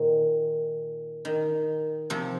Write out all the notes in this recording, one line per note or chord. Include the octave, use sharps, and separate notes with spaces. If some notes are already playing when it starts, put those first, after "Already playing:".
Already playing: A#2 D#3
D#3
C3 F3